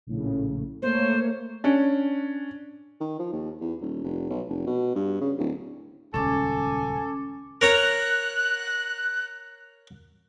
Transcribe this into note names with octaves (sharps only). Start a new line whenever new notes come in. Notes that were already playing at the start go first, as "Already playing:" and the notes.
A#1 A2 C#3
A3 A#3 C5 C#5
C#4 D4
D#3
F3
D#2
E2
D#1
F1
B1
F1
B2
G2
C#3
D1
D#1 C#2 C#4 A4 G#5 D6
A#4 C#5 A#5 F#6